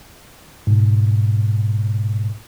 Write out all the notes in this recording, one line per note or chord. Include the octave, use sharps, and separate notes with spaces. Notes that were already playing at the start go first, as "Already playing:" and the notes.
G#2 B2